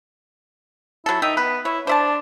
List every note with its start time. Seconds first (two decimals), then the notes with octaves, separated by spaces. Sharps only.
1.06 F#3 E4 A4
1.22 D#3 D#4 E5 G5
1.37 B3 B4
1.65 E4 C#5
1.87 D4 C5 E5 A5